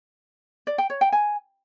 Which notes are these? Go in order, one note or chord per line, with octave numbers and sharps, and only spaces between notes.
D5
G5
C#5
G5
G#5